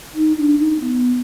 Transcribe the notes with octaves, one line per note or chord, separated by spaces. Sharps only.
D#4
D4
D#4
B3